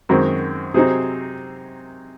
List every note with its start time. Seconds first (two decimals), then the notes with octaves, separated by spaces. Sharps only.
0.09 F#2 D#3 G#3 C4 F#4 A#4
0.74 C3 F#3 C4 D#4 G#4 C5